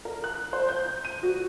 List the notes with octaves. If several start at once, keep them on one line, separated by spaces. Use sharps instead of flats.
A#4
F#6
C5
G6
D#7
F#4